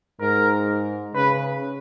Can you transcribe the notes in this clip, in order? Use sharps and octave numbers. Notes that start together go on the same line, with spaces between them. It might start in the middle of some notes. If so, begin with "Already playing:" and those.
G#2 A#4
C#3 B4